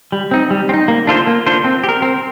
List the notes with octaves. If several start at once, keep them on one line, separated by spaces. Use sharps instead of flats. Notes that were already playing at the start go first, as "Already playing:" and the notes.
G3
C4 D#4
G3
C4
D#4
A#3
D4 F4 A4 C5
A#3
D4 F4 A4 C5
C4
G4
A#4
C4